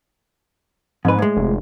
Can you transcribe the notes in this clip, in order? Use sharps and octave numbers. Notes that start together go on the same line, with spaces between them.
F2 G#2 B4
A2 G#3
F1